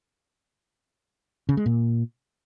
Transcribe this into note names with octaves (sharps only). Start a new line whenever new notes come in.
C#3
G#3
A#2